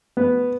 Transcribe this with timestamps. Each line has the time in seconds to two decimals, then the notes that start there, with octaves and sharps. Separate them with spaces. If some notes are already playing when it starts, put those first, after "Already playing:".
0.17 B3